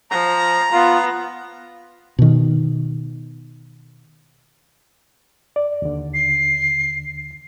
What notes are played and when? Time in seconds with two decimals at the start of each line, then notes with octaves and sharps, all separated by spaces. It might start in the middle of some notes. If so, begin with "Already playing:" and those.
0.11 F3 A#5
0.73 B3 F4
2.19 B2 D#3
5.56 D5
5.82 D#2 D3
6.14 C7